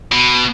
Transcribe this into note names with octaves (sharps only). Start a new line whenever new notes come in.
B2